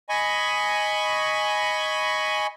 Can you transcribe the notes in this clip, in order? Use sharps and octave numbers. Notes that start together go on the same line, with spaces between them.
D#5 G#5 B5 C#6